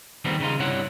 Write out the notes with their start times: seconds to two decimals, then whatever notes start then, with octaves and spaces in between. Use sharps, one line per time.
0.25 D#2 D#3 G3 B3 C4
0.40 C#3 D#4 F4
0.59 G2 C3 G3 E4 C#5 F#5